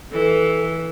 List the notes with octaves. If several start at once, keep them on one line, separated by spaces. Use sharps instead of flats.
E3 A4